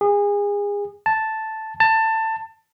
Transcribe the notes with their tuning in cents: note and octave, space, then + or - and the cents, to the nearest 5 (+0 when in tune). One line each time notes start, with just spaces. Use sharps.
G#4 -30
A5 +0
A5 +20